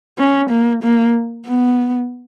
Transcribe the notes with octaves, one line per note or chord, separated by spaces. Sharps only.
C#4
A#3
A#3
B3